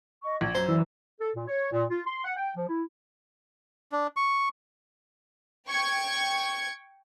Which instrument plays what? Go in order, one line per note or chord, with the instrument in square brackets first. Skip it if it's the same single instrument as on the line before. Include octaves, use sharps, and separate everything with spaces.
[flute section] D#5 C#6
[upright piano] A#1 [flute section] G#6
[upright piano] F#2 [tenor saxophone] C5
[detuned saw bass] E3 [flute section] D5 E6
[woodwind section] A4
A#2
C#5
A#2
F4
C6
F#5
G5
F3
E4
[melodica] D4
C#6
[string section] G5 C#6 G#6 C#7